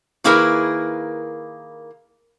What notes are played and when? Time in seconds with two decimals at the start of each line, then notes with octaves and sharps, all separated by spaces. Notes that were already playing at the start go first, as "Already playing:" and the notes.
0.24 D#3 A#3 E4 G#4 A#4 B4